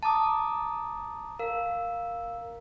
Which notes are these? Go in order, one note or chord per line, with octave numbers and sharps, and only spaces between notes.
A5 A#5 D6 D#6
A#4 F5